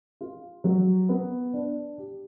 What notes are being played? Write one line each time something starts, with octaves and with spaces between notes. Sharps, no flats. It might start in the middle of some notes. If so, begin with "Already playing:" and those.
F4
F#3
B3
D4
G4